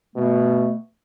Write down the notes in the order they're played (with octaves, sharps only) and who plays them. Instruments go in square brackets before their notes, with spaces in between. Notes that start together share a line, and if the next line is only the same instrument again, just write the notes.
[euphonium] B2 [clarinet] A3